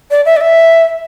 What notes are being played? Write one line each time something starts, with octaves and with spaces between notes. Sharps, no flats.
D5
E5
D5
E5